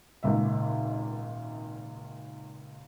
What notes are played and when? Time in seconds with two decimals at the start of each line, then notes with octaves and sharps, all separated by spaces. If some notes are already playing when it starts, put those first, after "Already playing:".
0.23 G#1 C#2 A#2 E5